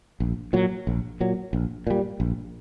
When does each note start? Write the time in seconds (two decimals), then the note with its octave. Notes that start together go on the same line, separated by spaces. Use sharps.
0.20 A#1
0.53 A#2 F#3
0.87 A#1
1.20 A#2 F#3
1.53 A#1
1.87 A#2 G3
2.20 A#1